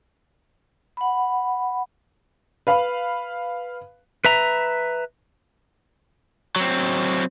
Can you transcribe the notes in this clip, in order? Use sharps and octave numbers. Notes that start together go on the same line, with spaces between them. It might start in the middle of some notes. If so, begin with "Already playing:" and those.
F#5 B5
B4 F5 B5
B4 E5 A#5
F#3 C4